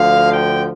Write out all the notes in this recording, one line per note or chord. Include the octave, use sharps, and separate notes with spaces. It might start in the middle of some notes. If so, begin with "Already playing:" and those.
Already playing: D2 D3 F3 F5
G5